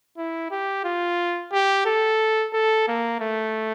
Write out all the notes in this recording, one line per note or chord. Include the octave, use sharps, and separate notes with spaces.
E4
G4
F4
G4
A4
A4
A#3
A3